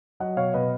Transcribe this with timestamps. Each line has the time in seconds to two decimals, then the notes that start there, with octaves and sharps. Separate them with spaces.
0.20 F#3 D#5 F#5
0.36 B2 C#5 F5
0.54 B2 B4 D#5